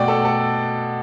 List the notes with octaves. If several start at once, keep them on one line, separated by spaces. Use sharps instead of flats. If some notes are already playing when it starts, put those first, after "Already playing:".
Already playing: B2 A3 D5 F#5 G5
A4
A4